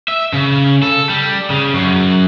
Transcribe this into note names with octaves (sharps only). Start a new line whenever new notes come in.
E5
C#3
A4
G3
C#3
F#2